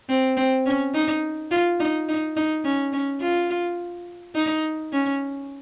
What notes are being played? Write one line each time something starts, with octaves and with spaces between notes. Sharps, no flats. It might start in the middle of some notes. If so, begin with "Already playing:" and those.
C4
C4
C#4
D#4
F4
D#4
D#4
D#4
C#4
C#4
F4
D#4
C#4